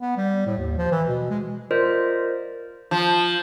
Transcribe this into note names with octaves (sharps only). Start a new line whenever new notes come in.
B3
G3
A2
D#2
F3
E3
B2
G#3
F4 A#4 C5 D5 D#5
F3